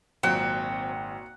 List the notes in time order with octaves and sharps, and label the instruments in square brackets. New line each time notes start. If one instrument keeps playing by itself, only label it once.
[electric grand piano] G#1 G5 E7 [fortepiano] A#2 F#3 [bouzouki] C4 [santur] F#5